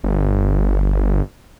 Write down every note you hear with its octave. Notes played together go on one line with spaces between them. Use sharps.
G1